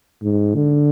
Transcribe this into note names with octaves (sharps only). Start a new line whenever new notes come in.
G#2
D3